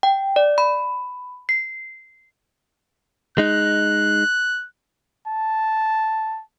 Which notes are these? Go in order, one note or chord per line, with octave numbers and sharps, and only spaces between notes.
G5
D5
B5
C7
G#3 D#4 F#6
A5